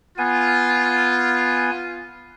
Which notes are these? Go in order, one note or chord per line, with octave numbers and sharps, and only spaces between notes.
B3 F4 G#5